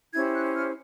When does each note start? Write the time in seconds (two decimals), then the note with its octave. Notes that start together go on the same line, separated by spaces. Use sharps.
0.14 C#4 E4 G4 C5 G#6
0.35 F#6
0.56 F6